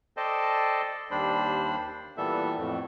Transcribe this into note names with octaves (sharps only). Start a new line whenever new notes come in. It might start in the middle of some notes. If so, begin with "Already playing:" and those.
A4 C5 D5 D#5 G5 A5
D#2 G3 D4 C5 B5
A#2 E3 G3 B3 A4 E5
F2 A2